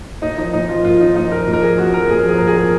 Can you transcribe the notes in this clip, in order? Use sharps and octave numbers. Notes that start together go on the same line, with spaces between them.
A#2 D#4
F3 D#4
A#2 D#4
F3 F4
A#2 F4
F3 D#4
A#2 D#4
F3 A#4
A#2
A#4
F3 G#4
A#2 F#4
F3 A#4
A#2 G#4
A#4
F3 G#4
A#2 A#4
G#4
F3 A#4